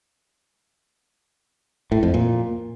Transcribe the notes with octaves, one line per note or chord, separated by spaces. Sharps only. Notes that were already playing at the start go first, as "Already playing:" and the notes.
A2
F2
A#2